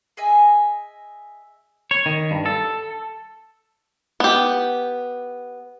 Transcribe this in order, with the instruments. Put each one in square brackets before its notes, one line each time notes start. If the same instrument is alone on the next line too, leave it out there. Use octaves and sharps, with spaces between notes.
[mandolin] G#4 D#5 E5 G#5
[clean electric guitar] C#5
D#3
G2
A4
[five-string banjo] B3 G4